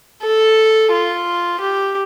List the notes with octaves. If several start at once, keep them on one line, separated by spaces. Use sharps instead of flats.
A4
F4
G4